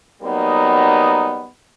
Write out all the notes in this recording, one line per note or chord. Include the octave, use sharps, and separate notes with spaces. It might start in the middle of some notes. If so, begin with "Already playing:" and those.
F#3 G3 A#3 B3 D#4